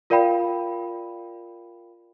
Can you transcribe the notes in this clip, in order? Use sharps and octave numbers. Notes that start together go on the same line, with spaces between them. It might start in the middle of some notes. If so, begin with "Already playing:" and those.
F4 A#4 D5 F5 G5 B5